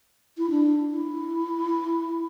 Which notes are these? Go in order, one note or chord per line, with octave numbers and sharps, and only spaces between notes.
E4
D4
E4